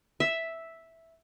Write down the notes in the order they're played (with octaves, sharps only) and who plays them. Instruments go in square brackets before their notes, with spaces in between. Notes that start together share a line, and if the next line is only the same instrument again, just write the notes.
[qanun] E5